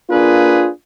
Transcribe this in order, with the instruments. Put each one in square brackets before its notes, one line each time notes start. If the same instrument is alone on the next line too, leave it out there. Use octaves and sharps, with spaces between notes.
[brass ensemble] A#3 D4 F4 G#4 B4